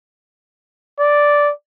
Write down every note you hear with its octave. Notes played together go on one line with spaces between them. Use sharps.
D5